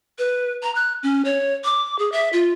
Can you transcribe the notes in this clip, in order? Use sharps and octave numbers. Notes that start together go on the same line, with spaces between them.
B4
A#5
F#6
C#4
C#5
D6
G#4
E5
F4